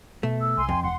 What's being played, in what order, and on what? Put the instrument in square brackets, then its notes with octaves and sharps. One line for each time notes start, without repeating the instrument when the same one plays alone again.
[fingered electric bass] B2 [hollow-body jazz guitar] A3
[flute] E6
[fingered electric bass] C2 [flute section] G#5 C6
[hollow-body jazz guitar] F2 [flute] G5
[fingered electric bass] E1 [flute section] F#5 C6